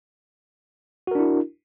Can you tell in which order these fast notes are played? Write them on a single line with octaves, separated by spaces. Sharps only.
F#4 A#4 D4 E4